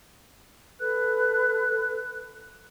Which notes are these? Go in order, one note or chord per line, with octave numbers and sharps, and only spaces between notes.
A4 B4 F#6